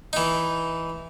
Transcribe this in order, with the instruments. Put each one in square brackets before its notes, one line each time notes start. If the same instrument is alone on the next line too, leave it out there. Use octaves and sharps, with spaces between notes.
[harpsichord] E3 D#4